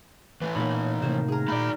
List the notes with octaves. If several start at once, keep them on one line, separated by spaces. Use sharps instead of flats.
E3 A3 B4
A#2 A#3 B3 D#4 C#5 B5
A2 C3 D#3 A#3 C5
G#4 A#4
A#2 A3 D5 B5